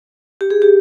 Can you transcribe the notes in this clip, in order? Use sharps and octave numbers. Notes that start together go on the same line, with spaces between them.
G4
G#4
G4